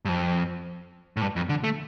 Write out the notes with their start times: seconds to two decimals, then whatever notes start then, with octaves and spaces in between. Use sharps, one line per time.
0.05 G2
0.09 F2
1.17 A2
1.22 G2
1.36 F2
1.49 D3
1.64 A3